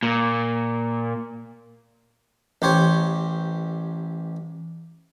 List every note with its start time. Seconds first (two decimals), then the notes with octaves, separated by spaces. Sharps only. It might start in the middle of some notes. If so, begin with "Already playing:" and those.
0.03 A#2
2.62 A1 G4 C5 C#5